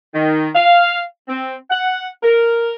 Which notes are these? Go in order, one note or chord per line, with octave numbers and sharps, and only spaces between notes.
D#3
F5
C4
F#5
A#4